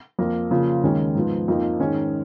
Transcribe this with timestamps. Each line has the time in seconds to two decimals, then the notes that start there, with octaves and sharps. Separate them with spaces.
0.19 F2 F3 A#3
0.50 C#3 F3 A#3 F4
0.83 D#2 D#3 G#3 C#4
1.15 G#2 F3 B3
1.48 F2 F3 A#3 D#4
1.80 G#2 D#3 G#3 C#4